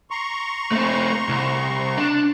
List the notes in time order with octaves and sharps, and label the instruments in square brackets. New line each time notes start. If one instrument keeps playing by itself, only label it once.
[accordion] A#5 C6 C#6
[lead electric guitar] A3 C4
C2
D4